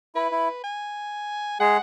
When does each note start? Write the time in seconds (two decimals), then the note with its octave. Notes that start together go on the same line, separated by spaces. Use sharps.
0.15 E4 B4
0.31 E4
0.64 G#5
1.60 G#3 G#4 F#5